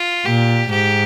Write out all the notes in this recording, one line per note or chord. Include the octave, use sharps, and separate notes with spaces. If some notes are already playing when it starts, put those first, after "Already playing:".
Already playing: F4
A#2 G4
G#2 G4